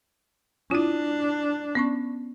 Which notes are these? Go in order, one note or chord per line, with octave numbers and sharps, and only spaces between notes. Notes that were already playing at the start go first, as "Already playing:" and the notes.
D4 E4 F4
B3 C#4 C#6